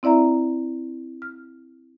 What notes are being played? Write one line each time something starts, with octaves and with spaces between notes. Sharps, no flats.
C4 E4 D5 E5 A#5
F6